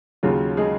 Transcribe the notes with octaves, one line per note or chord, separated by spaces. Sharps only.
D#2 C#3 F#3 F4
G#3 G#4